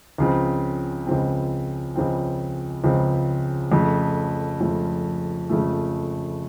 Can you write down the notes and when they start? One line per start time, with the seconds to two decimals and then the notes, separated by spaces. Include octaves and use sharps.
0.18 C#2 C#3 F3 C4
1.07 C#2 C#3 F3 C4
1.96 C#2 C#3 F3 C4
2.84 C#2 C#3 F3 C4
3.72 F2 C#3 F3 A3
4.60 F2 C#3 F3 A3
5.50 F2 C#3 F3 A3